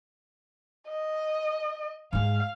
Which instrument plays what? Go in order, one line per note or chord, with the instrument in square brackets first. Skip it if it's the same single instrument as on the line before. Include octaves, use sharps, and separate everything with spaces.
[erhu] D#5
[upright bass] G#2 G#3 [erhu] F5